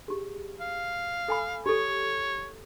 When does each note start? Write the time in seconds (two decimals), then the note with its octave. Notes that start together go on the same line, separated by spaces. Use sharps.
0.08 G4 G#4
0.60 F5
1.28 A4 G#5 B5
1.66 G4 A4 C#5